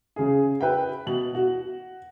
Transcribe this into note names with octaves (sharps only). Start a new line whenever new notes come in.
C#3 G#4
B4 E5 G5
B2 F#7
F#4